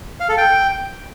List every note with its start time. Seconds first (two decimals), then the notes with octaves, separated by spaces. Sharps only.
0.20 F5
0.29 A4
0.37 G5